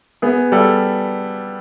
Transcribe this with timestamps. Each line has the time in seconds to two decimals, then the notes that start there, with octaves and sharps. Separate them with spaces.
0.22 B3 G#4
0.52 G3 A4